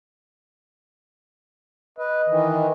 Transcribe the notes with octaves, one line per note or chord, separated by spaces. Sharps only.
B4 D#5
D#3 E3